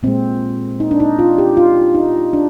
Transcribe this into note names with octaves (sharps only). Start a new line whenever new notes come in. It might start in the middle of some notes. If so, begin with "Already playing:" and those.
A#2 G#3 C4
D#4
D4
D#4
F4
G4
F4
D#4
D4